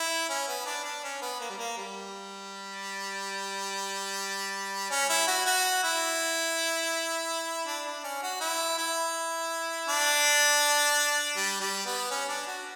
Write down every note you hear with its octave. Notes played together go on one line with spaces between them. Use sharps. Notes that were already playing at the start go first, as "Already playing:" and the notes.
Already playing: E4
C#4
B3
D4
D4
C#4
B3
A#3
G3
A#3
G3
C#4
E4
F#4
F#4
E4
D4
D4
C#4
F#4
E4
E4
D4
G3
G3
B3
C#4
D4
F#4